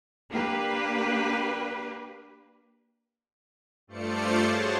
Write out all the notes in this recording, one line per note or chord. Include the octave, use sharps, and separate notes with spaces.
A#3 D4 G4 B4
G2 A3 F4 C5 D5 C#7
D4 F#4 G#4 C5 C#5 A5